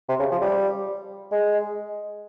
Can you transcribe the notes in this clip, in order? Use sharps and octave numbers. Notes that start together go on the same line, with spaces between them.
C3
C#3
F3
G3
G#3